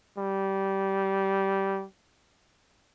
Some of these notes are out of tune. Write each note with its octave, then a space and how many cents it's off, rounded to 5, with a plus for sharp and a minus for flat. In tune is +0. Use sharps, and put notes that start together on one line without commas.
G3 -15